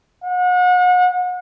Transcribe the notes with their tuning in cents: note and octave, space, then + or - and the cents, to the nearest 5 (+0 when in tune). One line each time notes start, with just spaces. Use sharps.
F#5 -35